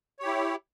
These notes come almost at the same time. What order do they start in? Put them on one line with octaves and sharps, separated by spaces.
C#5 G4 E4